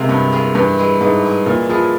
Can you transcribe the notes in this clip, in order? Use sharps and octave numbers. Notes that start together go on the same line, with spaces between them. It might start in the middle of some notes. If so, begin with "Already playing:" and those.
Already playing: C3 G#3 A#3 F4 G#4
G2 F3
A#3 F4 G#4
G2 E3
G#3 E4 G#4
G#2 E3
G#3 E4 G#4
A#2 E3
F3 G#3 E4 G#4